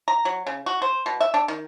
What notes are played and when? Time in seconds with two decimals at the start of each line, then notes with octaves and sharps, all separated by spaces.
0.08 A#5
0.25 F#3
0.47 C#3
0.66 F#4
0.82 C5
1.06 B2
1.20 E5
1.34 D4
1.48 D#3